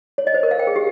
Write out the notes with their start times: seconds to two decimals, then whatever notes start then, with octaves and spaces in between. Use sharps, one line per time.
0.18 C#5
0.27 D#5
0.34 C5
0.43 A#4
0.51 F5
0.59 G5
0.67 G#4
0.76 G4